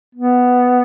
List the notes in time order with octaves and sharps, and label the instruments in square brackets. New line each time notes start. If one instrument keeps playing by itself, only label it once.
[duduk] B3